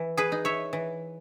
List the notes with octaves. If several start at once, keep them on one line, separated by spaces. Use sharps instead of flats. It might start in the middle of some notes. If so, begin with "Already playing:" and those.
Already playing: E3
G#4 B4
D#4
C#5 E5
E3